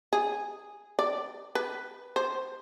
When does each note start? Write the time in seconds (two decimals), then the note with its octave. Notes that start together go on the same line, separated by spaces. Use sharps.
0.13 G#4
0.99 D5
1.55 B4
2.16 C5